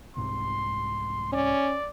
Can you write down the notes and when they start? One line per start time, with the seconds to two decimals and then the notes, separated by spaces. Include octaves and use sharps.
0.17 C2 G#2 C3 C6
1.33 C#4 D5